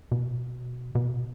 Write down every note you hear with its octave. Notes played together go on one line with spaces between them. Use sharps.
B2
B2